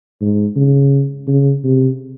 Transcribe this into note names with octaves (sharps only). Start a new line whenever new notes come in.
G#2
C#3
C#3
C3